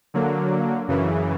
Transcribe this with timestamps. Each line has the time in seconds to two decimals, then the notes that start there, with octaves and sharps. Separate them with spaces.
0.14 D3 F#3 A#3
0.88 F#2 C#3 E3